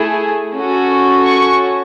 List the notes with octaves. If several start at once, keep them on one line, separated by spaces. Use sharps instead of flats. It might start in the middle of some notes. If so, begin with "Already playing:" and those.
Already playing: A3 E4 G#4
C#4 F#4 A4
C#6